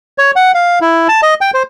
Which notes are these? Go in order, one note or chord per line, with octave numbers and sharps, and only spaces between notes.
C#5
F#5
F5
E4
A5
D#5
G5
C5